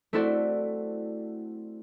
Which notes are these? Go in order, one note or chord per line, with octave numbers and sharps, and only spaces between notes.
A3 C4 E4 F#4 A4 D5